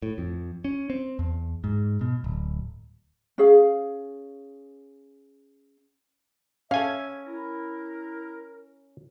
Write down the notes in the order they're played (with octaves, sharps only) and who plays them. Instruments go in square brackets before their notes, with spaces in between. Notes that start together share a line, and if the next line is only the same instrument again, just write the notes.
[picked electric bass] A2
F2
C#4
C4
E2
G#2
B2
D1
[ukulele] C#4 G#4 F5
[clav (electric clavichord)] C#4 G#5 [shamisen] A4 F5 [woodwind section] E5
[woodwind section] E4 A#4